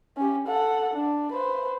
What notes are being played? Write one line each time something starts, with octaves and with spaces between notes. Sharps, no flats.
C#4 G4
A4 F#5
D4
B4 C5